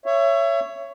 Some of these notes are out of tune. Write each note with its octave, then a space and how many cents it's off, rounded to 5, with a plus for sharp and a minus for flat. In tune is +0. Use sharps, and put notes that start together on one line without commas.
C#5 +5 E5 +25